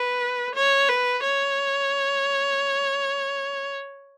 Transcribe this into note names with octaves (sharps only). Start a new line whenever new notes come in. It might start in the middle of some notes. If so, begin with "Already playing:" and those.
Already playing: B4
C#5
B4
C#5